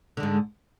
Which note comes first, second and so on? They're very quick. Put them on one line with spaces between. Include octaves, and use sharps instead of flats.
D3 G#3 G#2